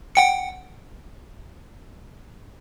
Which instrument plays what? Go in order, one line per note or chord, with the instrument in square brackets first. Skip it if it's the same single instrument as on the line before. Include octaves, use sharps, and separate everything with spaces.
[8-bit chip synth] F#5 G5 C#7